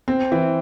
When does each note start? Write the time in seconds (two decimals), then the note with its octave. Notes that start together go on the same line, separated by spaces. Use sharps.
0.08 C4
0.32 E3